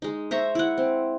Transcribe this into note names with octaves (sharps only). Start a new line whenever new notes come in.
G#3 D#4
C5 E5 A#5 C#6
E4 F#5
C4